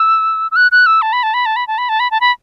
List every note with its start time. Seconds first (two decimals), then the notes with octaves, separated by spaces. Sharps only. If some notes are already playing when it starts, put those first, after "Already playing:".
Already playing: E6
0.51 E6
0.56 F#6
0.72 F#6
0.86 E6
1.02 A5
1.13 B5
1.23 A5
1.34 B5
1.46 A5
1.56 B5
1.67 A5
1.78 B5
1.89 A5
2.00 B5
2.11 A5
2.21 B5